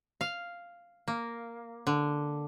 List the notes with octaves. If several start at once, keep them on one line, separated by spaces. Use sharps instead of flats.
F5
A#3
D3